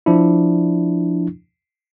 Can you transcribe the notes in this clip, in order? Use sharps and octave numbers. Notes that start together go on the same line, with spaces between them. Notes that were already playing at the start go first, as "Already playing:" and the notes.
F3 D4 E4